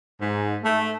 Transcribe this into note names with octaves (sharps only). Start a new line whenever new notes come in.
G#2
A3